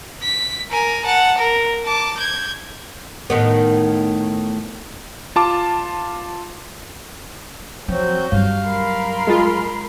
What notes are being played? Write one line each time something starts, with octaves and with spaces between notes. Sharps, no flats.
B6
A#4 G#5
F#5 A5
A#4
A5 D6
G6 G#6
A2 D#3 B3
F4 A5 D6
F3 F#3 C4 F#4 G6
G2 F#3 F5
A#4 B5 C6
G#3 F4